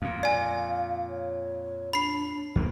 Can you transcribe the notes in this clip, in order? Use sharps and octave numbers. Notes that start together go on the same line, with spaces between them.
F2 A#2 F5
D5 G#5
C#5
D4 B5 C7
E2 D#3 A#3